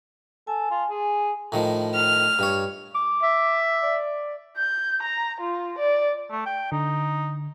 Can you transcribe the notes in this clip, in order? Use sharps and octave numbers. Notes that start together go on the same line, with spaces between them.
A4 G#5
F4
G#4
A2 D#3 F3
F6
G2 C#5
D6
E5
D5
G6
A#5
F4
D5
A3
G5
D3 D#4